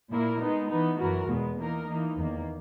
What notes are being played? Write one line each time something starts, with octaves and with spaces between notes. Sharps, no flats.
A#2 A#3 E4 A#4
G#3 B3 D#4
E3 B3 D#4
F#2 E3 B3 F#4 A#4
E2 B2 G#3 B3
E3 A#3 D#4 A#4
E3 A#3 D#4
E2 D#3 A#3